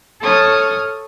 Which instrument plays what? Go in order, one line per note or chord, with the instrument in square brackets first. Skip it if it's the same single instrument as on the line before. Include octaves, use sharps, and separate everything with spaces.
[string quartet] A4 C#5 A5 C#6 D#6 F6